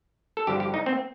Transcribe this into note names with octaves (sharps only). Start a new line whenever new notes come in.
A4
G2 D3 F3 G4
G4
D#4
C4